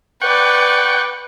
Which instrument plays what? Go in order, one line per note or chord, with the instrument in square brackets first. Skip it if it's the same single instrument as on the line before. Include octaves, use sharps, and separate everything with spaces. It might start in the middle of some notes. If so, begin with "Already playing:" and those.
[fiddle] B4 D5 [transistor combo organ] F#5 G5 C#6